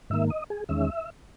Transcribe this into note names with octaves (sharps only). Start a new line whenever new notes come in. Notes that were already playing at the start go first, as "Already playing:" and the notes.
G#2 D#3 A#3 E5
D#5
G#4
E2 D#3 G#3 C#4 E5